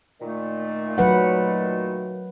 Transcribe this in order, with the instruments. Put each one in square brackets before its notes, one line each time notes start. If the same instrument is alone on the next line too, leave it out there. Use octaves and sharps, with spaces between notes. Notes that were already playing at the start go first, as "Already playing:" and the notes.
[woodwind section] A#2 D#3 A3
[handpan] F#3 B4 F#5